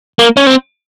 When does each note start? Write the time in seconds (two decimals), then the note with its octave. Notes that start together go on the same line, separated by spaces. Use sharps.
0.19 A#3
0.37 C#4
0.47 C4